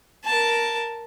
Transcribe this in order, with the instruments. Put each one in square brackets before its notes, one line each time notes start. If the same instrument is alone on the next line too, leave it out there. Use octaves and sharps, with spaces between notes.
[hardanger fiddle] A#4 A5